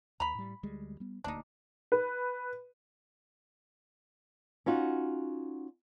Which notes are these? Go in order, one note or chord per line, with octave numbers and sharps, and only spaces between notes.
D#2 A#5 B5
A2 G3
D2 G3 G#3
G3 B3
D#1 D2 A#3 D4 D#4
B4
C#4 D#4 F4 F#4